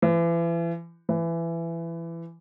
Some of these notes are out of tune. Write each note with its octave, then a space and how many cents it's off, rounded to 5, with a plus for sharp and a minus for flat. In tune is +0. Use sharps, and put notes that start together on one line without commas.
E3 +35
E3 +20